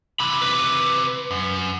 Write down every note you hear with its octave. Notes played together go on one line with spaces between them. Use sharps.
C3 E3 B5
B4
F#2